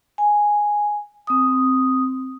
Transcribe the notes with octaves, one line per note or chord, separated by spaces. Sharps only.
G#5
C4 D#6